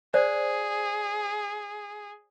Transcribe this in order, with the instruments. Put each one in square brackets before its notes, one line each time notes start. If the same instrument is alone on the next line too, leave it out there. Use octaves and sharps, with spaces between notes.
[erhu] G#4 [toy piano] C5 D5